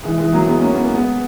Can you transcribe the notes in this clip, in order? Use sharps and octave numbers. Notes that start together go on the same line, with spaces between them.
E3 G#3
E3 G#3
F#3 A#3
G#3 B3
A#3 C#4
B3
A#3
G#3 B3